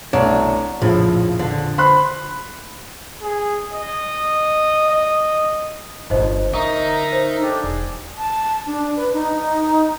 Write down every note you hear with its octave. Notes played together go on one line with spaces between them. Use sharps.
C2 B2 A3 D4 C#5
A#1 F2 A2 C#3 F3
D3
C5 B5 C6 F#6
G#4
D#5
D#5
G1 D#4 C5 D#5
D3 D#4 A#4 E5 C#6
C5 C#5
D4 G4 A4
E1 G#4
A5
D4
B4
D#4